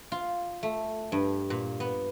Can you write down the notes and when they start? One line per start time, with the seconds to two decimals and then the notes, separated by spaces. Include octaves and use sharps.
0.12 F4
0.63 A3
1.12 G2
1.50 A#2
1.80 B3